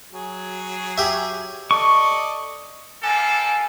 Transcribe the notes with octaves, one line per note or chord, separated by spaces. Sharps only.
F#3 G#4
G4 E5
A4 D5 D#5 C#6
G3 A#3 A4 G#5